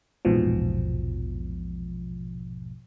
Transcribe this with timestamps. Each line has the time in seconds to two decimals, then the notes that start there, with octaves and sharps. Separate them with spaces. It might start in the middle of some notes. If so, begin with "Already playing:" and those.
0.25 A#1 E2 G#2 B2 F3